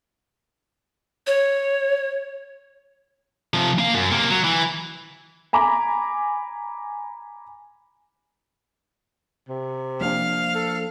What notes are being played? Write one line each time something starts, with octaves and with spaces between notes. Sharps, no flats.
C#5
C3 F3
A#3 F5
F#2
C3 A#3
F#3
E3
G#5 A#5 B5 D6
C3
F3 A#3 D4 F5
A4